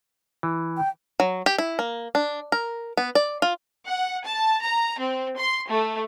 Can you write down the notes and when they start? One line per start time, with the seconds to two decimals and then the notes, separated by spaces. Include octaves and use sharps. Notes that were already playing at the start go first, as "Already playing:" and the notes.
0.43 E3
0.77 G5
1.20 F#3
1.46 G4
1.58 E4
1.79 A#3
2.15 D4
2.52 A#4
2.97 B3
3.15 D5
3.42 F4
3.86 F#5
4.23 A5
4.62 A#5
4.99 C4
5.38 C6
5.69 A3